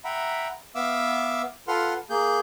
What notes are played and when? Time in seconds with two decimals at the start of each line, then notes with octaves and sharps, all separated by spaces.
0.05 E5 F#5 G5 A#5 B5
0.75 B3 E5 F5 D6 E6
1.68 F4 A4 B4 F#5 C6 F6
2.10 A#3 G#4 G6